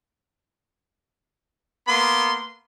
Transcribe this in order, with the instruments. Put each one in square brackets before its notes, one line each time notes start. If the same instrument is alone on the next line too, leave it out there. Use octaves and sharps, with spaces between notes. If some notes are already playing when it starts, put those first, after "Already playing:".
[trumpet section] A#3 B3 C6